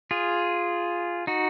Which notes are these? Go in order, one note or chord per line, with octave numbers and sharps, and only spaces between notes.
F4 G#4
D#4 F#4